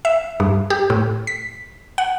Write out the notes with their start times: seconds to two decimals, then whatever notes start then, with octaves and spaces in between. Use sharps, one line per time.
0.05 E5
0.40 G2
0.70 G4
0.90 A2
1.27 B6
1.98 F#5